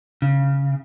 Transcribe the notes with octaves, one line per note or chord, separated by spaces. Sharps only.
C#3